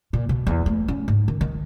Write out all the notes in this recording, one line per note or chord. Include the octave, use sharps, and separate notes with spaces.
A#2
B2
E2
A3
C#4
G#2
D#3
D#3